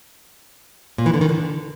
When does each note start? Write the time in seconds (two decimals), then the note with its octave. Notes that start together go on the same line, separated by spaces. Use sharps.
0.98 A#2
1.06 E3
1.14 D3
1.21 D#3
1.29 D3